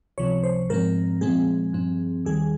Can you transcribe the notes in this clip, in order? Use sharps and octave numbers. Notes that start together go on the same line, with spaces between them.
C#2 C3 F3 C#5
C5
G#2 F3 G#3 C4 A#4
A#2 F3 G#3 C4 G#4
G2 F3 C4
D#2 D#3 G3 G#4